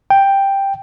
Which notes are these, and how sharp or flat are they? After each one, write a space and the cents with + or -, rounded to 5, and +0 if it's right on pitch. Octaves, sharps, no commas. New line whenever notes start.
G5 +5